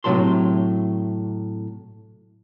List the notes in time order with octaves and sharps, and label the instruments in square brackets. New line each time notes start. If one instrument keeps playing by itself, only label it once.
[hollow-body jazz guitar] A2 C3 D#3 F#3 A5 C6